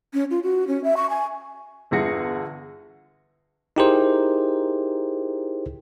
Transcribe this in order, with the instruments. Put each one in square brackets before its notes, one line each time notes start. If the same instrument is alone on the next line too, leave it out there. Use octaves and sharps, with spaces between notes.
[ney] C#4
F4
F#4
C#4
E5
C#6
G#5
[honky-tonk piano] G1 E2 D3 G#4 A#6 C#7
[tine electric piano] D#4 E4 G4 G#4 A#4 C5